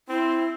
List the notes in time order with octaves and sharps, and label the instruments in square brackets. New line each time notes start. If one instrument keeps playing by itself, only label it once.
[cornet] C4 [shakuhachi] E4